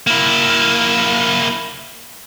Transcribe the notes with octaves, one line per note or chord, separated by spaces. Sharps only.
A#3 E4